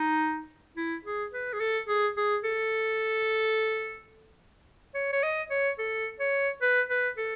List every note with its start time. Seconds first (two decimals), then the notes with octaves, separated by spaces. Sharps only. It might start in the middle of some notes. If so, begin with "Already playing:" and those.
Already playing: D#4
0.77 E4
1.05 G#4
1.32 B4
1.53 G#4
1.60 A4
1.88 G#4
2.17 G#4
2.44 A4
4.95 C#5
5.13 C#5
5.23 D#5
5.50 C#5
5.79 A4
6.20 C#5
6.62 B4
6.90 B4
7.18 A4